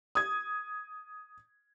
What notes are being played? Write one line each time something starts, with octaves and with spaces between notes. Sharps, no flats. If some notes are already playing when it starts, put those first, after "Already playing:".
D#6 G#6